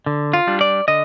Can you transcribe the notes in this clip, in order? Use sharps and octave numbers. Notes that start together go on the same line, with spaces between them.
D3
F4
G3 D4
D5
D3 D#5